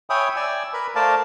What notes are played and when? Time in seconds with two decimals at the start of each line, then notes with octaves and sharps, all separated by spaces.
0.10 C#5 E5 G5 G#5 B5 D#6
0.36 D5 G#5 E6
0.74 A#4 B4 B5
0.95 A3 A#4 C5 D5 F5 A5